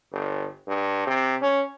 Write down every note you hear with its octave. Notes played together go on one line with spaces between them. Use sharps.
G1
G2
C3
C#4